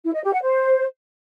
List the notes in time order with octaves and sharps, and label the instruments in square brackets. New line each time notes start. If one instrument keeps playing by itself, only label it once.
[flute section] E4
D#5
G4
F#5
C5